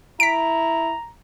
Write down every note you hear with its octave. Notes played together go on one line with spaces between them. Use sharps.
E4 A#5 B6 D7